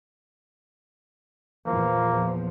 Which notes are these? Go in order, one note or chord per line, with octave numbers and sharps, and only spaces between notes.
E2 A#2 F3 A#3